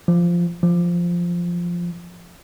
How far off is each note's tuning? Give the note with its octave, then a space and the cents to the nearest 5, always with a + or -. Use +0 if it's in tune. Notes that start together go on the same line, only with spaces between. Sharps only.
F3 -10
F3 -5